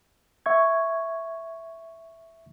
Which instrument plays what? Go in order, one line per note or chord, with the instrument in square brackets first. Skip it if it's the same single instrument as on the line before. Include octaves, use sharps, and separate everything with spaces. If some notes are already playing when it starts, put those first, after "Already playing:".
[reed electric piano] E5 C#6 G#6